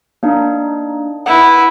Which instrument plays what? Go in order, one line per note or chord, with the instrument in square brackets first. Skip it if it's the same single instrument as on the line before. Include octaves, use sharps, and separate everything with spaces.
[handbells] A#3 D4 D#4
[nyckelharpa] E4 B4 [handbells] F#5